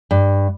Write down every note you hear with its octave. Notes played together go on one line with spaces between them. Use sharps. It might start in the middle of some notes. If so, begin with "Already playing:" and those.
G2